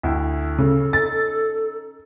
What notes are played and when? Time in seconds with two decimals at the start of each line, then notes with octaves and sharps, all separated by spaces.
0.03 D2 E4 G5
0.58 C#3 A4
0.93 C#4 D#4 A6